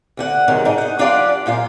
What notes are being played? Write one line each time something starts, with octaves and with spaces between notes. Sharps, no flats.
D2 D3 F#5
G#2 C3 D#3 F#3
G#2 D4 D#4
D#4 F#5
F#2 D4 F4 G4 D5 F#5
F#2 A#2 F4 F5